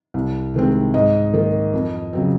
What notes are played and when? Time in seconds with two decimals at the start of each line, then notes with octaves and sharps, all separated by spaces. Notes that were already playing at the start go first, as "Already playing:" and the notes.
0.14 C2
0.54 C3 D#3 G#3 C4
0.94 G#2 D#5
1.33 D#3 A#3
1.73 F2
2.13 C#3 F#3 C4